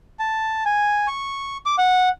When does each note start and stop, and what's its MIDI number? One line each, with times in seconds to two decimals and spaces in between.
0.19 0.64 81
0.66 1.07 80
1.07 1.57 85
1.66 1.76 86
1.78 2.09 78